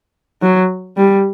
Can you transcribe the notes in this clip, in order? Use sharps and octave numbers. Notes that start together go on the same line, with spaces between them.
F#3
G3